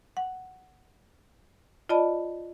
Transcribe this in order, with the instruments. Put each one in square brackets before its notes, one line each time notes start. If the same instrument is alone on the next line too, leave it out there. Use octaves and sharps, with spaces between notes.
[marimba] F#5
F4 D5 D#5 A5 B5